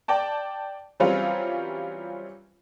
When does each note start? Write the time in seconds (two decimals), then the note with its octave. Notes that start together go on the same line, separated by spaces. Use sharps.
0.08 D5 G5 A5
1.00 E3 F#3 G3 C4 C#4 F4